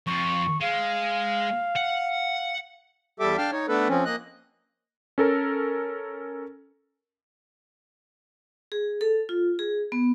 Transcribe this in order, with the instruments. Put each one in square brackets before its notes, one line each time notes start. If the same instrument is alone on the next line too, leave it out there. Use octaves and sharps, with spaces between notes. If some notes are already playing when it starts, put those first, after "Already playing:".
[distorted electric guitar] F2 F4 [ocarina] C#6
[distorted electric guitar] G#3 [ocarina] F5
[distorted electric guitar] F#5
[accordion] E2 G3 G4 A4 E5 D6
D4 F5 G5 A5 F6
D#4 C#5
A3 B3 D4 A4 B4
F3 C4 C#4
A#3 D#5 F#6
[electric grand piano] C#4 A4 A#4
[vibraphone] G#4
A4
F4
G#4
B3